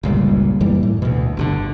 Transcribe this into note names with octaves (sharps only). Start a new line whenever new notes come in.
G1 C#2 A#2 G3
F#2 E3 G3 A#3
A2
D2 B2
G1 B2 D3